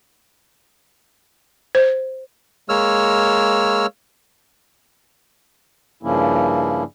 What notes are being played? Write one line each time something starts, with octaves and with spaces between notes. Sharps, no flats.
C5
G#3 A#3 C#5 E6 F6
G2 C#3 F3 A#3 C#4 E4